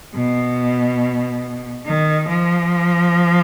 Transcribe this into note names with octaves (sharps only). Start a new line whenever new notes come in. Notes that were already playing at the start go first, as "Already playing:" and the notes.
B2
D#3
F3